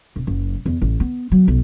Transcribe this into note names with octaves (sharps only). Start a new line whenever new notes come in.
E1
F#1
E2
A1
B3
F#3
B1